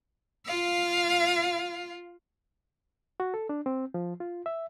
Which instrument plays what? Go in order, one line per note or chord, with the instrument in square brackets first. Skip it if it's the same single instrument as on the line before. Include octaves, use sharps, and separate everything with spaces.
[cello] F4 F5
[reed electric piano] F#4
A4
D4
C4
F3
F4
E5